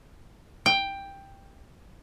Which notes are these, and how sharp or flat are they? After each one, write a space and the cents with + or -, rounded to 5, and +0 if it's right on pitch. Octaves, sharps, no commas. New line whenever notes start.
G5 +10